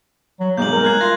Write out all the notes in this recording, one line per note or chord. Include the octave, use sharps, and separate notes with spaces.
F#3
B1 G2 G#3 A#3 G6 F#7
A#4
F#6 G#6 C7
F4 A#6